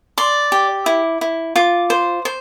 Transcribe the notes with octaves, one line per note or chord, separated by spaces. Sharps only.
D5 C6
G4
E4
E4
F4 D6
C5
C5